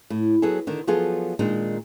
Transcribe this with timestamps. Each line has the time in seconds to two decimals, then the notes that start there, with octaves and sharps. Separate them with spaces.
0.10 A2
0.42 F#3 B3 G#4 A4
0.67 D3 D#3
0.87 F3 F#3 B3 F4 G#4 A4
1.39 A#2 D#3 G#3 D4 D#4